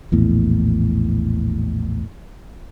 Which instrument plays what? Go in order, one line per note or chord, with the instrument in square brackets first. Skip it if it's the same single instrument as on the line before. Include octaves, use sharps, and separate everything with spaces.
[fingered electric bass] A#1 E2 A2